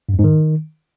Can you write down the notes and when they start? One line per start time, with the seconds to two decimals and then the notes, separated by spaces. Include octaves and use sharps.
0.09 G2
0.14 F2
0.19 G#2
0.24 D#3